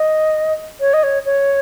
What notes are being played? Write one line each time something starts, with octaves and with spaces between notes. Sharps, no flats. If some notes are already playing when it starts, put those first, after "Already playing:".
Already playing: D#5
C#5
D#5
C#5
C#5